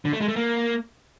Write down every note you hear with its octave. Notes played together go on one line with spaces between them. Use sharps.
D3
A3
G#3
A3
A#3